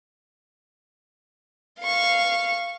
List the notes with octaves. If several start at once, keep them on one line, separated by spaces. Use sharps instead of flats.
F5 C#6